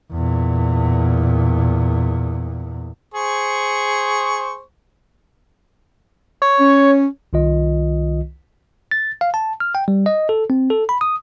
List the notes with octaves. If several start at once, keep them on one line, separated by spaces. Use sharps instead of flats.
E2 A#2
G#4 C5 C#6
C#5
C#4
C2 D#3 F4 D#5
A6
F5
A5
F6
G5
G3
D#5
A4
C4
A4
B5
D#6